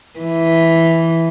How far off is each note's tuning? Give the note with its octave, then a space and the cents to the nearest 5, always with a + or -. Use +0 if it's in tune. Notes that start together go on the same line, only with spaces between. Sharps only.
E3 +0